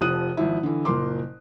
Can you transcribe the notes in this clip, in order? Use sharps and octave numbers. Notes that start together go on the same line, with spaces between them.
F1 F2 F3 D#6 F#6 D#7
G#1 F3 E4
D3 E3
F#1 A#2 A#3 C6 D6